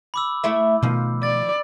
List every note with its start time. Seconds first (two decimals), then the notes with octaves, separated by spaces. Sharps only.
0.14 B5 D6 E6
0.44 A3 E4 E5
0.83 B2 D#3 F3 A3
1.23 D5 A6